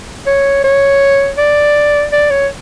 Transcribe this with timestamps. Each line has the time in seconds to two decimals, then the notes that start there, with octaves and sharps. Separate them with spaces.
0.27 C#5
0.64 C#5
1.38 D5
2.12 D5
2.30 C#5